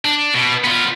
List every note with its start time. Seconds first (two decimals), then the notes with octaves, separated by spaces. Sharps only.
0.05 D4
0.34 B2
0.64 B3 F4